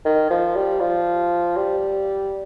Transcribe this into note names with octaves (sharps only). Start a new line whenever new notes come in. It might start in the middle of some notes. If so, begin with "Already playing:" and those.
D#3
F3
G3
F3
G3